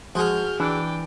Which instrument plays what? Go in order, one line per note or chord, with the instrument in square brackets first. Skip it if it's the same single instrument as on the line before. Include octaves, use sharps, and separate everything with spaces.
[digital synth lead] F3 [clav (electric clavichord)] G#3 [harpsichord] F#4 G#4 [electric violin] F6 G6
[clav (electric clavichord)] E3 [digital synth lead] D4 [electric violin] D5 G5